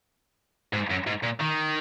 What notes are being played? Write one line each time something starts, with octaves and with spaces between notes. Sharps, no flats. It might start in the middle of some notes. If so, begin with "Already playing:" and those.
G#2
F#2
G#2
A#2
D#3